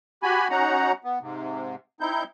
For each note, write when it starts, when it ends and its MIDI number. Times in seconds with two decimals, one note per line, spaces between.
0.23 0.48 66
0.23 0.48 67
0.23 0.48 80
0.23 0.48 83
0.50 0.92 61
0.50 0.92 63
0.50 0.92 66
0.50 0.92 78
0.50 0.92 82
1.04 1.19 59
1.21 1.75 44
1.21 1.75 48
2.00 2.24 60
2.00 2.24 63
2.00 2.24 64
2.00 2.24 91